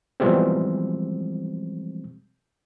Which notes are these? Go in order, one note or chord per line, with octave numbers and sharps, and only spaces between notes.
B2 E3 F3 G3 G#3 C4